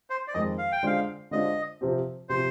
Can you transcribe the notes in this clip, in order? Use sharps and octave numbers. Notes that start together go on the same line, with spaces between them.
C5
D5
F2 D#3 G#3 D#5
F5
G5
D3 G#3 D4 F4 C5 F5
D3 G#3 D4 F4 C5 D#5
C3 F3 C4 G4
C3 F3 C4 G4 C5